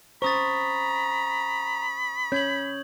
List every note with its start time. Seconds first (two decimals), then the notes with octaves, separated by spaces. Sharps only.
0.22 C#4 C5 A#5 B5 C#6 D#6 A6
2.32 C#4 C#5 G6 G#6 F#7